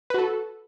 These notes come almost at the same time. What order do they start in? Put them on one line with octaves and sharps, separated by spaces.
B4 F#4 A4